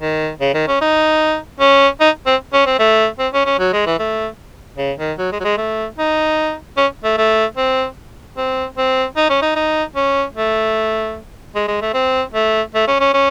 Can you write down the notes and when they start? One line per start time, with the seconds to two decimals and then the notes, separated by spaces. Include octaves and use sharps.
0.01 D#3
0.41 C#3
0.54 D#3
0.68 C#4
0.81 D#4
1.60 C#4
2.00 D#4
2.26 C4
2.53 C#4
2.66 C4
2.79 A3
3.19 C4
3.33 C#4
3.46 C#4
3.59 F#3
3.73 G#3
3.86 E3
3.99 A3
4.78 C#3
4.99 D#3
5.18 F#3
5.32 G#3
5.40 F#3
5.44 G#3
5.57 A3
5.98 D#4
6.77 C#4
7.04 A3
7.17 A3
7.57 C4
8.37 C4
8.77 C4
9.16 D#4
9.30 C#4
9.42 D#4
9.55 D#4
9.96 C#4
10.35 A3
11.55 G#3
11.68 G#3
11.82 A3
11.94 C4
12.34 A3
12.74 A3
12.88 C#4
13.00 C#4
13.14 C#4